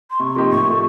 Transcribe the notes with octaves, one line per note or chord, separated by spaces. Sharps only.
C6
C3 C#6
F3 A#3 D#4 G4 C6
A2 C#6
F3 A3